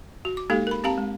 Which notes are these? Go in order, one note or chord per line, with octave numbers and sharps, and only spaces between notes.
F#4
D6
G#3 A#3 D#4 G4 A4 F5
A#4 B5
C4 G4 F5 A5 A#5
G#3